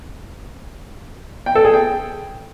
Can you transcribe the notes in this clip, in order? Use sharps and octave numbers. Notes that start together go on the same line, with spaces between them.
G5
A4
G#4
G5